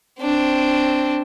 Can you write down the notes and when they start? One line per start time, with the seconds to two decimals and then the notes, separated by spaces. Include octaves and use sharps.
0.20 C4 D4